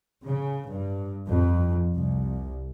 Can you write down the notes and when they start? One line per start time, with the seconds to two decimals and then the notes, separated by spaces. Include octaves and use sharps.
0.24 C#3
0.68 G2
1.30 F2
1.94 C2